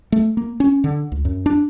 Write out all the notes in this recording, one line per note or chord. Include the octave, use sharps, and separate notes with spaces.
A3
A#3
C#4
D3
C#2
F#2
D4